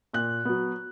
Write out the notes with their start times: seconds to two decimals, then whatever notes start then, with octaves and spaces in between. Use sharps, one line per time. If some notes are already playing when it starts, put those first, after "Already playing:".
0.13 A#2 F#6
0.45 F#3 B3